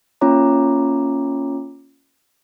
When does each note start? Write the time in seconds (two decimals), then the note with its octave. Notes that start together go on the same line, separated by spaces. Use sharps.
0.21 A#3 C#4 F4 C#5 A#5 D6